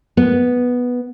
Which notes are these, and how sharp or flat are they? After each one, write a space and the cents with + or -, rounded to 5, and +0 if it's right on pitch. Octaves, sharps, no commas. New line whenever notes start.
B3 -5